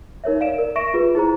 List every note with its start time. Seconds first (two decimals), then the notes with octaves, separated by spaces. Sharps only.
0.24 D#4 A#4 C#5 E5
0.40 D5 F5 D7 E7
0.58 A#4
0.76 E5 C#6 A#6 D7 E7
0.94 F4 G#4 B4
1.15 E4 G#4 C5 A#5